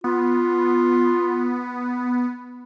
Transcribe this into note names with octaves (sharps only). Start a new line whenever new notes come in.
B3 F4